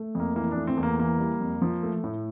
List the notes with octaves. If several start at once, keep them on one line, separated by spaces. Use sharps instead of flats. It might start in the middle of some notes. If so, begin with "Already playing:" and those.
Already playing: A3
F2 A#3
E3 A#3
D4
A3
C4
E2
A#3
E3 A#3
G3
F2
F3
A3
A2